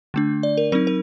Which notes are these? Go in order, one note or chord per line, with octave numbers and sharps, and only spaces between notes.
D3 A3 D4
D5
A#4
F#3 C4 D#4 A#4
A#4